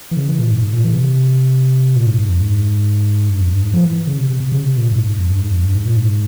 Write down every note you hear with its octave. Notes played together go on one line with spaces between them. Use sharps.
E3
C#3
E3
A#2
G#2
G#2
A#2
E3
C3
A#2
G#2
G#2
F2
G#2
G2
F2
G2
G#2
F3
E3
C#3
C3
C3
C3
C#3
C3
A#2
G#2
G#2
F2
G2
G#2
F2
G2
G#2
A#2
G#2